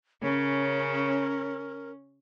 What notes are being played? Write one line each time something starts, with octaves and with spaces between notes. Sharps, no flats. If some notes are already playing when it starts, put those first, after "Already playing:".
C#3 C#4 A#4